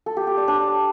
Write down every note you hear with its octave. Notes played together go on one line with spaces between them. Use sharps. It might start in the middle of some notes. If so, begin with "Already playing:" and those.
A4
G4
G4
D5
D4